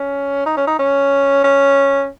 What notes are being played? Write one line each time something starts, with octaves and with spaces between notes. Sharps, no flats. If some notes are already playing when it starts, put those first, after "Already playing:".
Already playing: C#4
D#4
C#4
D#4
C#4
C#4